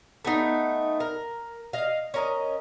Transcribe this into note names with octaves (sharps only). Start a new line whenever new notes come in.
A3 B3 D#4
A#4
D#5 F5
C#4 A#4 D#5